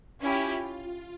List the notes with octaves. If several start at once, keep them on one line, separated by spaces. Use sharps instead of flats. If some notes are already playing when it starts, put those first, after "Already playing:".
C#4 E4 F4 G4